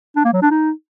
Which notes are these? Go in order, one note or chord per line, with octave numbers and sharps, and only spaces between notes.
D4
A#3
F#3
D4
D#4